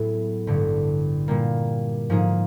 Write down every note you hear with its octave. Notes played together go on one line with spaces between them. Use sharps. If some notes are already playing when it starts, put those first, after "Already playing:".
Already playing: A2 F#3 B3 E4 G#4
A1 G2 D3
A#2 G3 A#3
G#2 F3 A#3 D#4 G#4